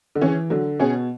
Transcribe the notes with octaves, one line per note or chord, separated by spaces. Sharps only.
D3
E3 C#4 G#4
D3 F#3
B2 C#4 G#4